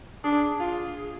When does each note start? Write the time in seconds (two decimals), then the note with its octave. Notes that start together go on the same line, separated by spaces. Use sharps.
0.24 D4 G#4
0.60 F4